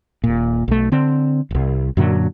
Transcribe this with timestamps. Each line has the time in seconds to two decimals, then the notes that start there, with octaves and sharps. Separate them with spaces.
0.24 D#1 A#2
0.68 B1 A3
0.92 D3 C4
1.51 D#1 C2
1.97 F#2 A#2 D3 F#3